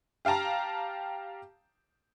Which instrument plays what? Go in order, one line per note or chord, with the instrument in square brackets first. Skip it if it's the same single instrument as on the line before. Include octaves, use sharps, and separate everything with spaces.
[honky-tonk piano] G4 F5 G5 A5 A#5